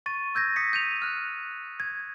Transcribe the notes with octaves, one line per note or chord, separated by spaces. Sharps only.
C#6 A6 D#7
E6 G6 G#6 A#6
D#6 A#6 B6 C#7
G6 D#7 F7
F6 F#6
G#6